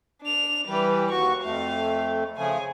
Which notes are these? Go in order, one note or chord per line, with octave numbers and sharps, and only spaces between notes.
D4 F7
E3 G3 G4 B4
D#2 F#4 C#6
F2 A3 F5
C#3 F3 A3 G#4 G#5